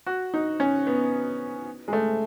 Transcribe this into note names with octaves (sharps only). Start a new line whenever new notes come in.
F#4
D#4
C#4
B3
G#3
A3